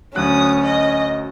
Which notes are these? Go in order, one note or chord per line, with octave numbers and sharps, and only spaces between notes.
D2 F#3 C#4 D#6 F#6
D#5